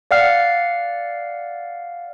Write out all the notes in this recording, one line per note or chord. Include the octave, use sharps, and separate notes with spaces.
D5 F5 F#5 F6 C7